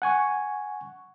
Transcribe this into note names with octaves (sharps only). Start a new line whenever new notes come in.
F#5 G#5 C#6